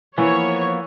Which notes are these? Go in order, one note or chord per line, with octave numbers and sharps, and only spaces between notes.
E3 F3 A#3 B3 C#5